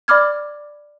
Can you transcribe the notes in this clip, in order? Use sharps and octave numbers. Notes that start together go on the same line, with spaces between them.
D5 B5 D6 F6 G#6